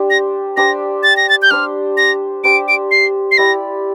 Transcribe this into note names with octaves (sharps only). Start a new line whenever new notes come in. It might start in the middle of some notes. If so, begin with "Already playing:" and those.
Already playing: D4 G4 C5
A#6
D4 G4 C5 A#6
A6
A#6
A6
G6
D4 G4 C5 F6
A#6
D4 G4 C5 D7
D7
C7
C7
E4 G4 D5 A#6